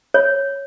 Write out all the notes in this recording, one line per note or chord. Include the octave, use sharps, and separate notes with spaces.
C#5